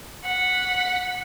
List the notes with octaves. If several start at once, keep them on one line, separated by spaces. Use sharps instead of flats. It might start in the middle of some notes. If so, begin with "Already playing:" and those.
F#5 B6